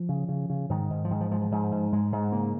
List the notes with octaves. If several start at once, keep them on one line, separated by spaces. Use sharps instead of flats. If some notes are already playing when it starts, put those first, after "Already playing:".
Already playing: F3
C#3
C#3
C#3
G#2 D#3
G#2
F3
G#2 D#3
F3
G#2 F3
F3
G#2 F3
G#2
G#2 G#3
G#2
C#3 A#3